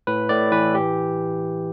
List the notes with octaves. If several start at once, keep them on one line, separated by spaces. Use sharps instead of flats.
A2 B4
A2 D5
E3 B4
G4